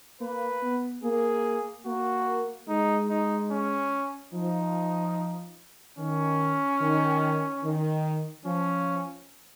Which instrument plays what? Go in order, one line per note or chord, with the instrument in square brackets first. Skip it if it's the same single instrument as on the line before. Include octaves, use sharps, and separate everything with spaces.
[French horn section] A#3 [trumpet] B4
[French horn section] B3
[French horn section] A#3 [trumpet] G#4
[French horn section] A#3 [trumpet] F#4
[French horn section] G#3 [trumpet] D#4
[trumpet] D#4
C#4
[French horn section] F3 [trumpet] D#4
[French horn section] D#3 [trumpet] C#4
[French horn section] D#3
D#3
[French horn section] F3 [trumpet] C#4